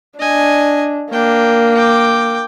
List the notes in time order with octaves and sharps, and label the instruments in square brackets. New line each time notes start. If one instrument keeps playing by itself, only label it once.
[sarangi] D4 [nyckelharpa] D#5 G#5
[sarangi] A#3 [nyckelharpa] D4 G5
[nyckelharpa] G5 D6